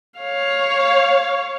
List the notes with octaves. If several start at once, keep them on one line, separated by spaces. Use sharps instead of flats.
C#5 F5